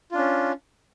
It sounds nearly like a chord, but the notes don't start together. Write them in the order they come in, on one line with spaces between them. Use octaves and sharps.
F4 D4 C#4